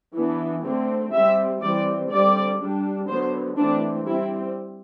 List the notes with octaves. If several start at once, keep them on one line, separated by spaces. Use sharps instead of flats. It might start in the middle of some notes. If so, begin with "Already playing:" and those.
E3 B3 D4
D3 A3 C4
G3 C4 E5
E3 G3 C4 D5
D3 G3 C4 D5
G3 D4
D3 F#3 B3 C5
E3 A3 C4 D4
G3 C4 E4